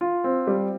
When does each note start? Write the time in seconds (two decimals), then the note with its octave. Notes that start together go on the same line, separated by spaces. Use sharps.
0.01 F4
0.24 C4
0.47 G3